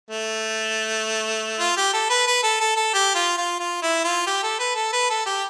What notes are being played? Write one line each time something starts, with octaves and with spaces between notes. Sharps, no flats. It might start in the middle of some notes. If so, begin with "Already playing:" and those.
A3
F4
G4
A4
B4
B4
A4
A4
A4
G4
F4
F4
F4
E4
F4
G4
A4
B4
A4
B4
A4
G4